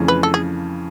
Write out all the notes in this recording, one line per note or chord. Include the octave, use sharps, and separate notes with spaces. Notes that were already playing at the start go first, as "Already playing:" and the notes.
Already playing: F2 C#3 E3 A3 C#4
B4
A4
G#4